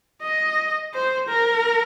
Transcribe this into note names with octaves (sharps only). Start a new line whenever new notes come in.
D#5
C5
A#4